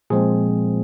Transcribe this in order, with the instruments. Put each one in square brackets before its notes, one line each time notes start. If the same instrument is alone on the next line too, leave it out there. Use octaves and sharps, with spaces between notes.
[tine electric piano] A#2 F3 G#3 C4 G#4